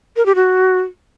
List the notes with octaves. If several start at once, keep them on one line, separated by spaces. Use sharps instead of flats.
A#4
G4
F#4